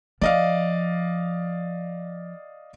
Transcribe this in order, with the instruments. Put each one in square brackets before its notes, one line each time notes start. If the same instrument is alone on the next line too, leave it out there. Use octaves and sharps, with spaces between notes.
[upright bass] F3 [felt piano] D5 D#5 F5